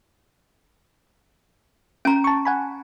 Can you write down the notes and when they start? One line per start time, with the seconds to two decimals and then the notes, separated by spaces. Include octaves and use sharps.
2.05 C#4 A#5 D7
2.24 A5 C#6
2.45 F#5 G#5 B5